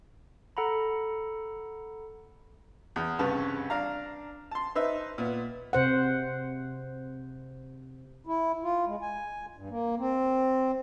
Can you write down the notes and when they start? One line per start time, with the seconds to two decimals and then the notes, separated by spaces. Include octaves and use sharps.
0.57 A4 F#5 A#5 B5
2.96 E2
3.19 C2 G2 C#3 C#4 B4 A5
3.70 D4 F5 A#5
4.51 A5 C6
4.75 D#4 B4 C5 E5
5.18 A#2 B3
5.73 C3 C5 F#5
8.27 E4
8.64 F4
8.87 G#3
9.02 G#5
9.55 G2
9.70 A#3
9.98 C4